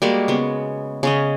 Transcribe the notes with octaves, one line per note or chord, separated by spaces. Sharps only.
G3 G#3 A#3 F#4
C#3 B3
C#3 C#4 D#5